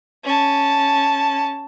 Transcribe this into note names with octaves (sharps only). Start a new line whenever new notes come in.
C#4 A5